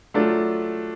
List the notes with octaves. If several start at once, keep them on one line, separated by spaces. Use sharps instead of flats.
F#3 A3 D4 F4